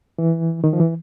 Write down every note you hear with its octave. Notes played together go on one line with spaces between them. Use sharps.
E3
D#3
F3
E3